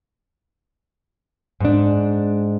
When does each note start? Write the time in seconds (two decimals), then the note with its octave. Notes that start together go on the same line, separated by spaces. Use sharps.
1.60 G#2 D4